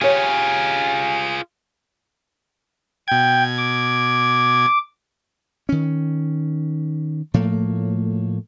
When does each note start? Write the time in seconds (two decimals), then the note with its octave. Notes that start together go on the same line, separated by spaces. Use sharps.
0.01 F4 G4 G#4 C#5 G#5
3.08 B2 G5 G#6
3.58 D6
5.69 D#3 C#4
7.34 A2 F3 A3 A#3